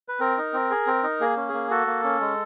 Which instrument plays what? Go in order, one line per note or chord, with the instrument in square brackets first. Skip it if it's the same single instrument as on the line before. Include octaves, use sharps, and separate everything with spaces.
[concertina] B4
C4 A#4
D#4
C4
G#4
C4
D#4
A#3 G#4
C#4
A#3 G#4
F#4 A4
A#3
C#4
G#3